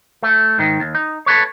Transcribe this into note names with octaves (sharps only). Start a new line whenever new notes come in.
A3
G#2 D#3
D#2
D#4
A4 B4 C#5